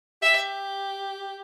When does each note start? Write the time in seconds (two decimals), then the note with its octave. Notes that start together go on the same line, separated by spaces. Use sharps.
0.22 G4 E5